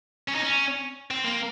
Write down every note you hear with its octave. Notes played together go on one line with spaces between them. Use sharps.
C#4
D#4
C#4
C4
A#3